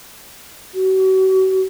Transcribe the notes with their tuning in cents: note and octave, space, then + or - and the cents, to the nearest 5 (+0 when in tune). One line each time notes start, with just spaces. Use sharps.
F#4 +40